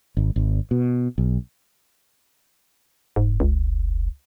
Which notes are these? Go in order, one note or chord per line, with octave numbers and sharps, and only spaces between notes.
G#1
G#1
B2
B1
F1 G#2
C#2